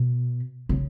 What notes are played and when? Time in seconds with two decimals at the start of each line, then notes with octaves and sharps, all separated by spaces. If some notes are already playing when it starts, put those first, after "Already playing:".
Already playing: B2
0.69 C#3